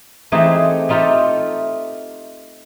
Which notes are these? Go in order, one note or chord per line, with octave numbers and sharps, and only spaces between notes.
E3 A3 C4 D#4 G4 G#4
A3 D#4 F4 G4 A4